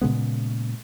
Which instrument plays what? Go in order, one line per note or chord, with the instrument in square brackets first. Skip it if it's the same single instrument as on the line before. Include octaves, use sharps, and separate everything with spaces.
[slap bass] A#2 C#3 G#3 B3